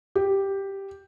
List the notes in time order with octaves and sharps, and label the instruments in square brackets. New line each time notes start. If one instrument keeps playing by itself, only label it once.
[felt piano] G4